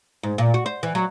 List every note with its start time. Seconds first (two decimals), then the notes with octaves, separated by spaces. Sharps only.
0.23 G#2
0.38 A#2
0.54 F#4
0.66 C5
0.83 E3
0.95 F#3